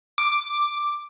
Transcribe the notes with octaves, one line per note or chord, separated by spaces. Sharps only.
D6